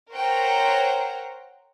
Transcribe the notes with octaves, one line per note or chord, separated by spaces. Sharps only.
A#4 C5 C#5 F#5 G5 A#5